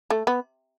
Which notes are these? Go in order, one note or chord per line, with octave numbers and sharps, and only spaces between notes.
A3
B3